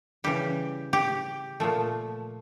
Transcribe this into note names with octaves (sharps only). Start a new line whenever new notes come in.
C#3 E3 G3 G4
G4
A#2 F3 A3